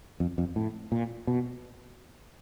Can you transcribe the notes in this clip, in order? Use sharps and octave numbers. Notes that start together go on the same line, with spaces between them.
F2
F2
A2
A#2
B2